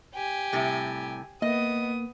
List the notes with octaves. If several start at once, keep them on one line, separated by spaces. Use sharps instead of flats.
G4 G#5
A2 C3 G3
A#3 B3 D#5 D#6